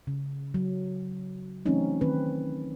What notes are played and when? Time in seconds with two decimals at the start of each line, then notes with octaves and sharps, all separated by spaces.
0.07 C#3
0.54 F#3
1.66 E3 F#3 A3 C4 C#4 D#4
2.01 D#3 C4 B4